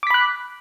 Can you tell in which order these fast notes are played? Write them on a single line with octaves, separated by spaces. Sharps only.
D6 B6 B5 F#6